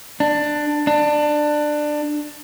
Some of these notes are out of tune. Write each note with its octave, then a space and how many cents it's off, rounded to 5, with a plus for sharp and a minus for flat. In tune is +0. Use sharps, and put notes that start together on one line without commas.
D4 +15
D4 +20